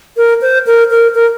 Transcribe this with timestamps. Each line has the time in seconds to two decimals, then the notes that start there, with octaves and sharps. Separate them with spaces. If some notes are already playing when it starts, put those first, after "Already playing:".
0.17 A#4
0.41 C5
0.66 A#4
0.90 A#4
1.15 A#4